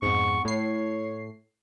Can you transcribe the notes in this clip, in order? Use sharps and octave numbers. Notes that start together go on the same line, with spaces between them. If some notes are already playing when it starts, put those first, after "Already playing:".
F2 G#2 B3 C#6
A2 C#5 C7